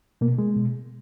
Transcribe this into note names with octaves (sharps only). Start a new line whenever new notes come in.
B2 A#3
G#3
B2